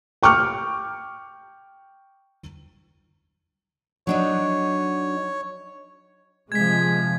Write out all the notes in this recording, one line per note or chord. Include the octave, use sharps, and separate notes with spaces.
G5 C#6 D6 F6
F#3 D4 D#4 C#5
C3 F3 G#3 G#6 B6